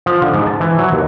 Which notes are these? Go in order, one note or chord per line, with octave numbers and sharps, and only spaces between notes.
F3
D3
G#2
A5
E3
F#3
D#2